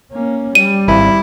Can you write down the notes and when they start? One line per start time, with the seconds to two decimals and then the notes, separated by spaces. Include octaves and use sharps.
0.12 A#3 C#4
0.55 G3 D#7
0.88 G#1 E4